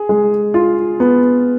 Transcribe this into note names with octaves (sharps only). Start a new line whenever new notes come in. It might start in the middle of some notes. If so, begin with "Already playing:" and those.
Already playing: G#4
G#3
F4
B3